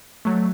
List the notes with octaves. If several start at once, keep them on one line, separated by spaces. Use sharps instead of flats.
F#3 A3